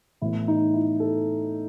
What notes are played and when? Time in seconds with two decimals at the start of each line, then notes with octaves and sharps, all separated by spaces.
0.22 A2 E3 B3 E4
0.48 D#4
0.74 E4
1.00 A4